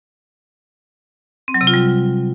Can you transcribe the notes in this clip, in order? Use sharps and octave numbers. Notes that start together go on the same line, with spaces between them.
C4
F#3
C3
F4
G3